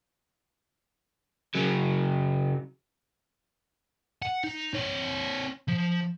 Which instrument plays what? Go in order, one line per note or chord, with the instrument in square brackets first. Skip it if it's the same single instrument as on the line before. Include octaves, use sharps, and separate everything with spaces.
[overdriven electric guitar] C#3 F#3
[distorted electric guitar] F#5
D#4
C4 C#5
F3